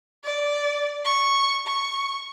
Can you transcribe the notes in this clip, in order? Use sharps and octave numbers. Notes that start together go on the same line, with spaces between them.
D5
C#6
C#6